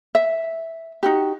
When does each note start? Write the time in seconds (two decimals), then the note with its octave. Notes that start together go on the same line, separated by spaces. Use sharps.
0.15 E5
1.03 D#4 F#4 G4